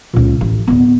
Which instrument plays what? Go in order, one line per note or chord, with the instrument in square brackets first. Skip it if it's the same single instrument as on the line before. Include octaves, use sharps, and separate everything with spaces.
[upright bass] C#2 A#2
A1
D1 B3